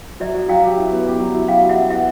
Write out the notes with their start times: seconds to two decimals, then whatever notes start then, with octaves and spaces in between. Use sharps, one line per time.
0.20 F#3 D5 E5
0.34 F#3
0.48 F#3 F5 G5
0.63 G4
0.77 E4
0.92 B3
1.06 G4
1.19 F#3
1.34 E4
1.48 F#3 F5 G5
1.63 G4
1.69 E5 F#5
1.76 E4
1.90 B3 E5 F#5